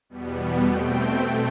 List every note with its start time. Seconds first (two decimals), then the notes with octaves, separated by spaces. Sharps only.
0.09 E2 B2 G3 B3
0.63 B2 A3 C4 G5
1.17 B2 A3